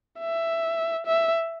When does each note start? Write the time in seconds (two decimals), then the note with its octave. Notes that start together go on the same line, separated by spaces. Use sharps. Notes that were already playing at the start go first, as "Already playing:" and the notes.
0.20 E5
1.06 E5